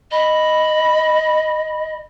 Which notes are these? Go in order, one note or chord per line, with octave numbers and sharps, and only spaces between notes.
D#5 B5